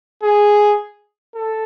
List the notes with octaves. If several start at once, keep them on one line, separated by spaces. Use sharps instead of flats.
G#4
A4